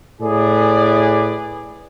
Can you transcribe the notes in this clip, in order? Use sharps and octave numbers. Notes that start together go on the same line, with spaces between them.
A2 G#4 B4 D5